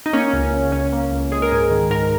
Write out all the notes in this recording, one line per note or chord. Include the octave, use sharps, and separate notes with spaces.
D#4
A#3 C#4
C#2
C#3
C#2 C#4
A#3
C#2
G#3 G#4
A#4
G#2 G#4
D#3
G#2 A#4